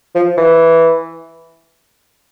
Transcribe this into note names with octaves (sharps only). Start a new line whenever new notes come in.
F3
E3